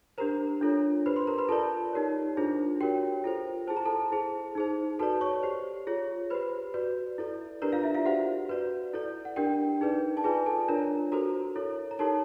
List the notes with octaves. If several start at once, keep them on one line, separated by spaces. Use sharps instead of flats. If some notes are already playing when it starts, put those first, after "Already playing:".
D4 G4 A#4 C5 A#5
D4 F4 A4 C#5
G4 B4 C5 B5
C5 C6
A#4 A#5
B4 B5
F4 A4 A#4 D5 A5
D#4 G4 A#4 C#5
D4 F4 G#4 C5
F#4 G4 A#4 C#5 G5
F4 A4 C5
E4 G#4 C5 A5
A#5
A4 A5
E4 G#4 C5
D#4 G#4 C5
F#4 A4 B4 D5 A5
C#5 C#6
G4 C5
F4 G#4 C#5
G4 B4 C5 B5
F#4 B4 D5
E4 A4 D5
D4 G4 A#4 B4 D5 A#5
F4 F5
E4 E5
F4 F5
F#4 G4 C5 F#5
F#4 B4 D5
E4 A4 D5
F#5
D4 G4 A#4 G5
D#4 G#4 B4 D5
A5
F4 G#4 B4 D5 G#5
A4 A5
D4 F4 A#4 C#5 A#5
F#4 A4 A#4 C5 A#5
E4 A4 C#5
A#5
D#4 G4 A4 A#4 C#5 A5